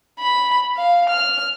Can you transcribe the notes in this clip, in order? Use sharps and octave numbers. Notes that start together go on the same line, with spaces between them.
B5
F5
F6